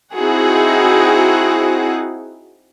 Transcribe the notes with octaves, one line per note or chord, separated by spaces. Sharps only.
C4 D#4 E4 F#4 G#4 F#5